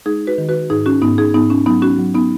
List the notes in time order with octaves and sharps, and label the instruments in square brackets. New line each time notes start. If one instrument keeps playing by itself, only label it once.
[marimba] G#3 D#4 G#4
F#4 B4
D#3
F#4 B4
G#2 D#4 G#4
C#4 F#4
G#2 B3 D#4
D#4 G#4
G#2 B3 D#4
C#4
F#3 B3 D#4
C#4 F#4
F#3
B3 D#4